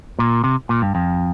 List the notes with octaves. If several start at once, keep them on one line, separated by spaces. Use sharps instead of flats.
A#2
C3
A#2
G2
F2